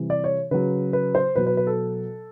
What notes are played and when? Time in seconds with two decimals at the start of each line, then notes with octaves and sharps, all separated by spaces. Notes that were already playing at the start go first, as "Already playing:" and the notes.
Already playing: C3 E3 G3
0.10 D5
0.24 C#5
0.51 C#3 F#3 B4
0.93 B4
1.15 C5
1.36 B2 F#3 B4
1.47 B4
1.57 B4
1.67 A4